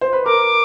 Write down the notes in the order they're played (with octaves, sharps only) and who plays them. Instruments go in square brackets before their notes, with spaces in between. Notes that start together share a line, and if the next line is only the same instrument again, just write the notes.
[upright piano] C5
B4
[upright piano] A#4 [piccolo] D6